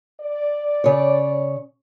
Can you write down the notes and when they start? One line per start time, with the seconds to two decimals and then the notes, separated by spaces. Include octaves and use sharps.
0.21 D5
0.84 C#3 C#5